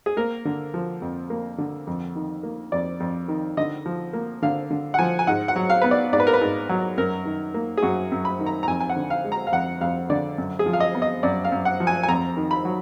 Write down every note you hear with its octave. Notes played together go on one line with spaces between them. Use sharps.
G#4
A#3 A#4
D3
F3
F2
A#3
D3
F2
D#3
A#3
F2 D5
F2
D#3
D3 D#5
F3
A#3
D3 F5
D3
F#5
F3 G#5
G#5
G#2 F#5
F#5
F#3
F5
B3 B4
D5
G#2 D5
B4
A#4
B4
G#2
F#3
F#2 A#4
D#3
A#3
G#4
F#2 F#4
F#2
B5
D#3
A#5
A#5
F2 G#5
G#5
F#5
D3
F5
G#3
A#5
F5
F2 F#5
F2 F5
D3 D5
F#2
G#4
F3
F5
D#5
B3
D#5
F#2 D5
F5
F#2
F#5
F3
G#5
G#5
F2 A#5
D#3
B5
F#3